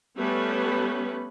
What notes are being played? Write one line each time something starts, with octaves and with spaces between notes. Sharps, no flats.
G3 A3 B3 C#4 B4